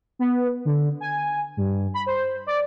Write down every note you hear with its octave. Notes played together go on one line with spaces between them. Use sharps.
B3
D3
G#5
G2
B5
C5
D5